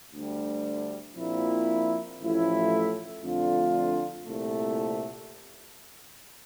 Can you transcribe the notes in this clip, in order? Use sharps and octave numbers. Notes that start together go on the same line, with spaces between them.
D2 D3 G3
A#1 A#2 F3 C4 E4
A1 A2 F3 A3 E4
F2 D3 A3 D4 F4
C2 A#2 A3